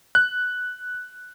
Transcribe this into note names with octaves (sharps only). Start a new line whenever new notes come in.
F#6